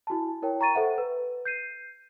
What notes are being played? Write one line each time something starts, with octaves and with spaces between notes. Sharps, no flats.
E4 F#4 G#5 A5
E4 A#4 C#5 G5
G5 A#5 C#6 A6 D#7
A4 C5 E5 F#5
B4
G6 C7 D#7